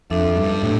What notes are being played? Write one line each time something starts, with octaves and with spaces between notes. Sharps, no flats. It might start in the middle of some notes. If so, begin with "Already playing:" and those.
F2 D4 A4 E5
G2
A2